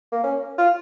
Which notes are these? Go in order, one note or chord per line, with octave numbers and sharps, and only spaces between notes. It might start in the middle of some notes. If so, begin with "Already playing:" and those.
A#3
C#4
F4